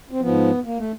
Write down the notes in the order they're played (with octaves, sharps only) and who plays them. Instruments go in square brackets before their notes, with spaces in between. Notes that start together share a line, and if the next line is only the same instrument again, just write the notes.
[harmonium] C4
G#2 F3 B3
A#3
A3